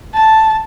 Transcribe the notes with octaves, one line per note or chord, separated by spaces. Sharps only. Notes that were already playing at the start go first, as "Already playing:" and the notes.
A5